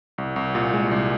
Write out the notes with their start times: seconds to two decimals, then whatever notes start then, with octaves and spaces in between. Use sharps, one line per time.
0.18 C2
0.36 C2
0.55 A#2
0.73 G#3
0.91 C2